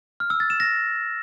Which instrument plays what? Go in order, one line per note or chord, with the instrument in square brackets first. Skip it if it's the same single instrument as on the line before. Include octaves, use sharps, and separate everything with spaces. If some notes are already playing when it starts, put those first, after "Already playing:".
[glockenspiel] F6
E6
A6
E7
A#6